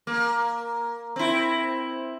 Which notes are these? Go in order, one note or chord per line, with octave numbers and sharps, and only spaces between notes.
A#3
C4 E4